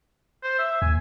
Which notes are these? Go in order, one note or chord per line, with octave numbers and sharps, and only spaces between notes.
C5
E5
D#2 G#5